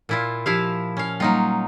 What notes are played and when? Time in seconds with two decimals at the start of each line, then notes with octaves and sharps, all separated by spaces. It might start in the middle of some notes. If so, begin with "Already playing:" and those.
0.09 A#2 E4 F4
0.46 F3 E4 G4 F5
0.97 C#4 F5
1.20 F#3 G3 A#3 D#4 F4